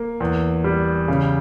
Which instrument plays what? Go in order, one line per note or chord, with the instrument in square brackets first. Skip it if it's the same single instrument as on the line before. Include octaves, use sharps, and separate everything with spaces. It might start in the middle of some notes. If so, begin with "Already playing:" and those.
Already playing: [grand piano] A#3
E2
G3
C#3